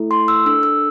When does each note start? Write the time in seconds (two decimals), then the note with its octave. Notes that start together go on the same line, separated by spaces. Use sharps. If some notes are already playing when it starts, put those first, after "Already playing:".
Already playing: A3 E4 A4
0.11 C6
0.28 E6
0.46 D4 A4 E6
0.63 E6